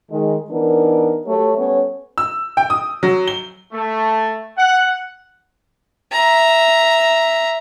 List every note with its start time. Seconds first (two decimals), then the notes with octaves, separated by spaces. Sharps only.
0.11 D#3 G#3
0.51 E3 B3 D4 D#4 A#4
1.26 F#3 A3 G4 C#5
1.56 G3 B3 C#4 A4 C#5
2.18 E6
2.57 G5
2.70 D#6
3.03 F#3
3.28 G7
3.72 A3
4.57 F#5
6.12 E5 A#5